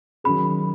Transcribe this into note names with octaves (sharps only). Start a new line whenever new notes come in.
D#3 F#3 C#4 G#4 B5